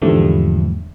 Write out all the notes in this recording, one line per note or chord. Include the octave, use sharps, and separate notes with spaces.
E2 G#2 D3 F3 G3 A3